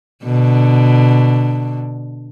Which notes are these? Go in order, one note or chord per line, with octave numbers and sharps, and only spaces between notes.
B2 D3